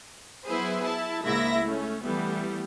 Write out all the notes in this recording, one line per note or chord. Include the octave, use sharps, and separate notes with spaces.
F#3 B3 E4 G#4 B4 C5
E4 A5
C#2 G#2 A#3 E4 E5 A#6
A3 C#4
E3 G3 A3 B3